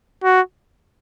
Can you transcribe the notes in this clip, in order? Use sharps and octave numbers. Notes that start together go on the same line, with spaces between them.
F#4